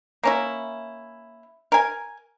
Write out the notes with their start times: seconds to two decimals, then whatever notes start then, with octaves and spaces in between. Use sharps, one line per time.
0.24 A#3 C#4 E4
1.72 A#4 G#5